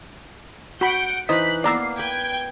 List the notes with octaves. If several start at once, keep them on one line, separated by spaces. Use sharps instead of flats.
F#4 F#5 B5 G6 D7
E3 D#4 C5 D#5 F#6 B6
A#3 B3 D5 A#5 D6 E6 C7
B4 G5 G#6